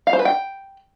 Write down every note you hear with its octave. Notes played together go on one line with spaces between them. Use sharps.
F5
C5
B4
G5